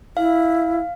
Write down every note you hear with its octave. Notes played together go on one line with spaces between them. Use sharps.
E4 F5